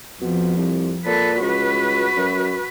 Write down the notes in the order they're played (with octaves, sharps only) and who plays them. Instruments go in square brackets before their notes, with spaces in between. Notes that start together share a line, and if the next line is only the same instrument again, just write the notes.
[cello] F2 [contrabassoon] B2
[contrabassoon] C2
[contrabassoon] A#2 [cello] A4 B4
[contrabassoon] C#2 [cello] F#4 B4
[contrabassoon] F#2